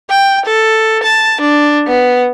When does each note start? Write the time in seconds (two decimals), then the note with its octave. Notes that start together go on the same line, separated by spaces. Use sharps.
0.10 G5
0.46 A4
1.03 A5
1.41 D4
1.87 B3